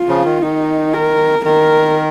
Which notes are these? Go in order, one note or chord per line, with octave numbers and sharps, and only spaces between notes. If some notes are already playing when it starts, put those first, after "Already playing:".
Already playing: F4
C#3 F3
D#3
D#3 D#4
A#4
D#3 A#4